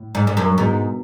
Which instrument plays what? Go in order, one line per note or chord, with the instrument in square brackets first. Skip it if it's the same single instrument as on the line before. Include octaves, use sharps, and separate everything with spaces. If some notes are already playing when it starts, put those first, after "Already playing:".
Already playing: [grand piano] A2
[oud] G#2
G#2
F#2
[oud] G#2 [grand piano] B2